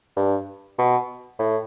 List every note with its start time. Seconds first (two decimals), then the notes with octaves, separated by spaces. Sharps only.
0.16 G2
0.78 B2
1.39 A2